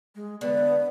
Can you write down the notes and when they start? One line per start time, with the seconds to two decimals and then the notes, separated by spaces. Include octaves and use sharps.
0.15 G#3
0.41 D3 A3 B3